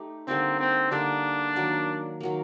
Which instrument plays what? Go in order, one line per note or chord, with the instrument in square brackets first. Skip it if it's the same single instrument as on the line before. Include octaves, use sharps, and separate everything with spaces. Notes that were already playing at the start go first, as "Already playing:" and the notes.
Already playing: [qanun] A3 D#4 G4
[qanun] D3 G3 A#3 D#4 [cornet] C4
[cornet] C4
[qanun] D3 G3 A#3 D#4 [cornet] D4
[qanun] D#3 F#3 A#3
D#3 F#3 A#3